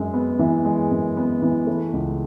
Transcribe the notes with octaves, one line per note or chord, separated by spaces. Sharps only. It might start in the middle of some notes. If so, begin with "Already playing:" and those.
Already playing: F#2 G#3
B3
E3
G#3
F#2
B3
E3
A3
C#2